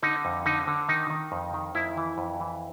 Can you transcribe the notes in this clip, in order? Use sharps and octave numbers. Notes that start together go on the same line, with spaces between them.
D3 D#4
F2
D3 D#4
D3
D#3 D#4
D#3
F2
D#3
F2 E4
E3
F2
E3